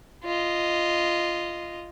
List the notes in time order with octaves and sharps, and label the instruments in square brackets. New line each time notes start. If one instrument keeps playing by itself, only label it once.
[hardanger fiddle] F4 D#5